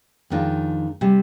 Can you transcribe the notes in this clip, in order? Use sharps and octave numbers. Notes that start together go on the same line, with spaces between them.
F2 D#3 G#3 D4 F4
C3 G3